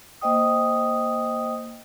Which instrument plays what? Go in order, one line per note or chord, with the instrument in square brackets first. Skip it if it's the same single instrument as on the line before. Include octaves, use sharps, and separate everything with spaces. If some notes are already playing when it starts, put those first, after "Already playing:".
[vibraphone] A#3 C5 D#5 G5 D#6